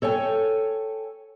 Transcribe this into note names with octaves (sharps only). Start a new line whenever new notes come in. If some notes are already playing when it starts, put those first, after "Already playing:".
A4 C#5 G5 G#5